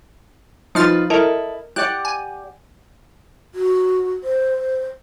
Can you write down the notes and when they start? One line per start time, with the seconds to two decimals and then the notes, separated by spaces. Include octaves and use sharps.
0.75 F3 D#4 F4 B4 F6 A6
1.10 E4 A4 A#4 D#5
1.76 G4 D5 F#5 F#6
2.05 G#5
3.55 F#4
4.24 C5